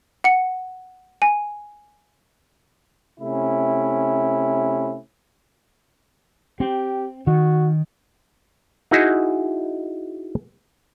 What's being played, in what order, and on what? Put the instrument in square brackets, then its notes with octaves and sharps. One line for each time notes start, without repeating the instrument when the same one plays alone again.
[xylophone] F#5 C#7
G#5
[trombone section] C3 A3 C#4 E4
[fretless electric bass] C4 [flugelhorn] G4
[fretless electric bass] D#3 [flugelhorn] F#4
[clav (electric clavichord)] D#4 E4 F#4 G#4 D#5 E5